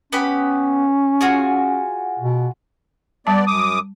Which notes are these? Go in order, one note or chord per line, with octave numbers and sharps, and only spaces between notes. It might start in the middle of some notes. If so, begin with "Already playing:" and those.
B3 C#4 G4 B5
F4 F#4 G#4
B2
G3 B3 D5 A5
F#2 D6 D#6